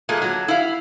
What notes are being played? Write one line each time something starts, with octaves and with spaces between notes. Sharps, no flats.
A#2 G#3 A3
F#3
E4 F5